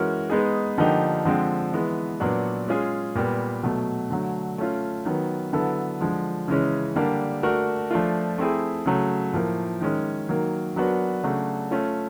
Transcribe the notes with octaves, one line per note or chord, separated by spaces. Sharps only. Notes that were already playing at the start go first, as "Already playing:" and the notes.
Already playing: E3 G#3 C#4 F#4 A#4
G#3 B3 D#4 G#4
D3 F3 A#3 D#4 G4
D3 F3 G#3 C4
E3 G#3 B3
A#2 F#3 B3 D4 F#4
G#3 C#4 F4 G#4
A#2 G3 B3
B2 F#3 A3
D3 F#3 A3
A3 C#4 F4
D#3 F#3 B3
D3 F#3 B3 E4 A4
D3 F3 G#3
C#3 E3 G#3 C#4
D3 G3 A#3 D4 G4
A3 D4 F#4 A#4
F3 A3 D4 F4
A3 C4 E4 G#4
C#3 F#3 A3
A2 F3 A#3
D#3 G#3 C#4
D#3 F#3 A#3
F#3 B3 D4 F#4 A#4
C#3 F#3 A3 D4 F#4
A3 C#4 F4